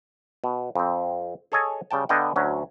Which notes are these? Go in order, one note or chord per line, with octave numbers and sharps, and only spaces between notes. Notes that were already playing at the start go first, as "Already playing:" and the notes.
B2
F2 C4
G#4 A4 C#5 D#5 G#5
C#3 G3 G5 A5
D3 B3 D#5 F5 G5
D2 F#3 C#4